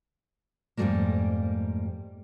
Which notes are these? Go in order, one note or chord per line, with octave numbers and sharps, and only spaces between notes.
F2 G#2 D#3 G3 A3 A#3